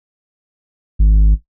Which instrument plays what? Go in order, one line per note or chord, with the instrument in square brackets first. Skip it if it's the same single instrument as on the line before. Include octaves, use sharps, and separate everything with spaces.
[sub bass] G#1